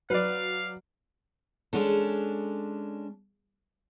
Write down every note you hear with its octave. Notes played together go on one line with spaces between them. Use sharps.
F#3 B4 D5 F5
G#3 C#4 D4 A4